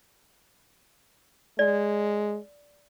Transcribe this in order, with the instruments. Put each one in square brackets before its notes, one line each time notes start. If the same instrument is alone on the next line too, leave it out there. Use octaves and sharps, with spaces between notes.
[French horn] G#3 [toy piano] D5